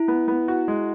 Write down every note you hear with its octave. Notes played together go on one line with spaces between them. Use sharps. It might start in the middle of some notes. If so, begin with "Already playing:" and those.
Already playing: E4
B3
B3
F#4
G#3